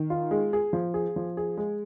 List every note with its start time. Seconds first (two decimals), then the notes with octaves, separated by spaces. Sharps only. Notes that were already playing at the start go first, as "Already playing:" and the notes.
Already playing: D#3
0.10 F4
0.31 G#3
0.53 G#4
0.73 F3
0.94 G#4
1.16 F3
1.37 G#4
1.57 G#3